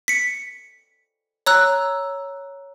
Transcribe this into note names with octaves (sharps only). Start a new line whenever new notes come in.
B6 C#7
C#5 A#5 E6 F#6